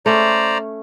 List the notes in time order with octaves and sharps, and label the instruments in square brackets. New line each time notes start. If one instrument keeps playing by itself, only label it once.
[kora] A3 C#4 [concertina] C5 D5 A#5